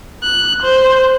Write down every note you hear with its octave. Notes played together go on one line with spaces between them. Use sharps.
F#6
C5